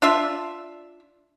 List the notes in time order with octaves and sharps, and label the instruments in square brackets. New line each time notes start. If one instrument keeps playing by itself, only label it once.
[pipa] D4 F4 E5